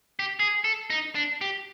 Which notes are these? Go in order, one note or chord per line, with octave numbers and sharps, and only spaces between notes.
G4
G#4
A4
D#4
D4
G4